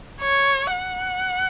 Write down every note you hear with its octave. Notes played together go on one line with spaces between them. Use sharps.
C#5
F#5